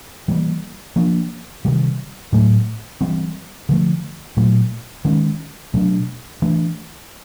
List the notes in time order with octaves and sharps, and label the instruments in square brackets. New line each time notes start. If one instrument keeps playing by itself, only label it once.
[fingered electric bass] E3 G3 A#3
F3 A#3 D4
C3 D#3 G3
A2 F#3 A3
E3 G3 C4
D3 F3 A3
A#2 F#3 A3
D#3 G#3 C#4
B2 F#3 A3 D4
E3 A3 D4